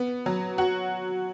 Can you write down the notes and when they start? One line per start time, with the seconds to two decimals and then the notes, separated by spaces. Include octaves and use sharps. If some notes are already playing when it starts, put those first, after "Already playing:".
Already playing: B3
0.26 F#3
0.58 F#4